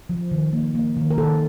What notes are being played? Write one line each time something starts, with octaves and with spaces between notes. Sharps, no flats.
F3
D#3
A#3
A#3
D#3
A#4
D#3 A4